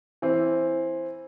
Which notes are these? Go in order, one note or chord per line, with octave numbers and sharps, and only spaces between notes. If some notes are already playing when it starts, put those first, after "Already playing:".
E3 C4